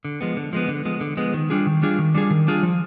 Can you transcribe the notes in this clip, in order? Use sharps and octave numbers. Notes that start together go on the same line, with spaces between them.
D3
F3 G#3 B3
D3
F3 G#3 B3
D3
F3 G#3 B3
D3
F3 G#3 B3
D#3
G3 D4 F4 G#4
D#3
G3 D4 F4 G#4
D#3
G3 D4 F4 G#4
D#3
G3 D4 F4 G#4
F3